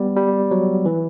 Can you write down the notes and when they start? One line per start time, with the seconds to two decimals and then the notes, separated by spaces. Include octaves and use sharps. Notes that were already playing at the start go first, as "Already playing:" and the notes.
Already playing: G3 B3
0.17 G3
0.51 F#3
0.85 E3